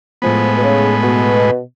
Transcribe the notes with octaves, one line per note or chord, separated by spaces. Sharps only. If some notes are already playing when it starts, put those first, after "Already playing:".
A2 F3 G#3 B3
B2
C#3
B2